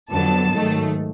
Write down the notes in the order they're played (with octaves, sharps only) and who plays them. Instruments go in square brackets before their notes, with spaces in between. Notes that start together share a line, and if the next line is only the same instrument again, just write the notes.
[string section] F2 D3 F#3 B3 A5
G#2 D#3 F#3 A3